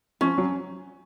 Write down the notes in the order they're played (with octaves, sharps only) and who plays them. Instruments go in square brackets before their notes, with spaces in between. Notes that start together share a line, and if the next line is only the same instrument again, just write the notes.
[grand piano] F3 [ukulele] C#4
[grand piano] F#3